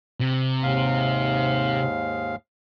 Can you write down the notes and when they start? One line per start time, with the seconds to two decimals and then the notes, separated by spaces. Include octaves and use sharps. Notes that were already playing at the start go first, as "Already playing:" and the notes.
0.20 C3
0.63 D#2 G#2 F5